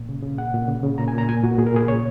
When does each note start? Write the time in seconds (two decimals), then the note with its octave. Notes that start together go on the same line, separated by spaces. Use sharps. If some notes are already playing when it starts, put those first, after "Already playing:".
Already playing: A#2
0.09 C#3
0.23 C#3
0.38 A#2 F#5
0.54 A#2
0.68 C#3
0.83 C#3
0.98 A#2 A#5
1.08 G#5
1.14 A#2 A#5
1.29 A#2 G#5
1.43 A#2 F#4
1.58 A#2 G#4
1.66 A#4
1.74 A#2 G#4
1.88 C#3 C#5